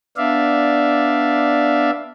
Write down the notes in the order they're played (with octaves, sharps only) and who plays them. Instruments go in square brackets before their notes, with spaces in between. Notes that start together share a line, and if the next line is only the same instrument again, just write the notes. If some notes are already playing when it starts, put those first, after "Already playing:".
[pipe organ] B3 D4 D5 E5 F5